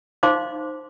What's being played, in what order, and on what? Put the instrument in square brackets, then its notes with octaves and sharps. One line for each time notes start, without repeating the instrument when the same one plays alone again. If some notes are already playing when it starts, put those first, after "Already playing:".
[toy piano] D#4 C5 F5 C6 D6